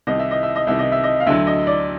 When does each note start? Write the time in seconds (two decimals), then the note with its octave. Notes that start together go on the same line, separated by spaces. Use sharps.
0.07 C2 C3 D#3 D#5
0.19 E5
0.31 D#5
0.43 E5
0.56 D#5
0.67 C2 C3 D#3 E5
0.79 D#5
0.92 E5
1.03 D#5
1.20 F5
1.27 D2 D3 F#3 E5
1.47 D#5
1.67 D5